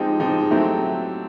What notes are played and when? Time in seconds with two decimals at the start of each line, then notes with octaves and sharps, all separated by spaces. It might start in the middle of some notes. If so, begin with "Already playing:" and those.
Already playing: F3 G#3 C4 D#4 G4
0.20 F3 G#3 C4 D#4 G4
0.51 F#3 A3 C4 E4 G4